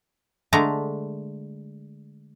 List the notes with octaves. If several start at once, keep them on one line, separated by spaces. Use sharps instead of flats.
D3 G#3 A3 A#5